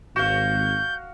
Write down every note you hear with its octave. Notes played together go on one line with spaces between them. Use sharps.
G#1 F#4 F5 G6